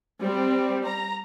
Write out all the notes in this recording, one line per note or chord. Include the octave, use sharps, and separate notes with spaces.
G3 C4
A#5